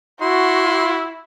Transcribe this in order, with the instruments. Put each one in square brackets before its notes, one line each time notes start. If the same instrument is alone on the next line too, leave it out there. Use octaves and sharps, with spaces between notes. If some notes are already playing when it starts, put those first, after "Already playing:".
[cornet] E4 [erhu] F#4 [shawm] C6